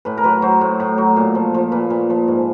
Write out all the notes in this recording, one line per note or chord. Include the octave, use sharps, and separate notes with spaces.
A2 B4
A#4
F#3 B4
F#3 C5
A2
A2
F#3
A#2
F3
F3
A#2 B4
A#2
F3
G#2